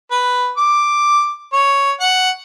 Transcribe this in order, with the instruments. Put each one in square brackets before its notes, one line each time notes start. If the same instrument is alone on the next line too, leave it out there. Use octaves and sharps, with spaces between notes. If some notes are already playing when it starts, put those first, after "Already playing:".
[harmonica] B4
D6
C#5
F#5